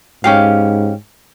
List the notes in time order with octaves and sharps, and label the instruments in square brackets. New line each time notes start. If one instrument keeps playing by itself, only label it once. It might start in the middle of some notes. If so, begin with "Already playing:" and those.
[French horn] G#2 [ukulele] C#4 G4 F5